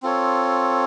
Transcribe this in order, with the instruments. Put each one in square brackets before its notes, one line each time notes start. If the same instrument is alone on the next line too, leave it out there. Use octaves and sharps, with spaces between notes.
[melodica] C4 F4 A4 C#5